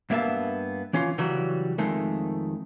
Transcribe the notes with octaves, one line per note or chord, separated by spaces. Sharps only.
G2 A#3 B3 E5 F5 A5
E3 C#4 F4 C6
C#3 E3 F#3 G3 F#4
F2 D#3 G#3 A3